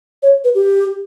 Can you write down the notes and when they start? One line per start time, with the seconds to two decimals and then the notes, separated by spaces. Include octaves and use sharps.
0.23 C#5
0.44 B4
0.55 G4